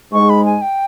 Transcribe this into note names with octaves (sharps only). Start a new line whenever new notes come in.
G#2 G#3 C#6
B5
G#5
G5